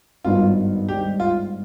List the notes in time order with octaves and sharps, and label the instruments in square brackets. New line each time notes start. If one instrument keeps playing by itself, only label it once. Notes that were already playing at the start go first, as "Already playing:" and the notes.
[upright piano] G#1 G2 D#3 B3 [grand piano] F4
[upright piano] G#2 G3 D4 [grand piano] G4
[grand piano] F4